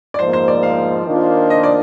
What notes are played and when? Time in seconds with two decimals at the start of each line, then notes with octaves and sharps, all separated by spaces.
0.14 D5
0.18 G#2 F3 A#3 C5
0.33 C5
0.48 D5
0.63 F5
1.07 D#3 A#3 D4 F4 C5
1.50 D#5
1.63 D5